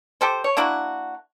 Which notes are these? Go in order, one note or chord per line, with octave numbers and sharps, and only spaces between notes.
G4 A4 C5
C#5
A#3 D4 E4 F#4